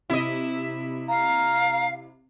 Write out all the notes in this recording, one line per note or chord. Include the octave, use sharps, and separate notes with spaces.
C3 E4 D#5
F5 A#5